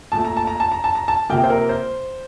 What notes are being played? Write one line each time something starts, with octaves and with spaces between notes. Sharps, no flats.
A#2 A3 A5
A#5
A5
A#5
A5
A#5
A5
A#5
A5
C3 F3 A#3 G5
C5
A#4
C5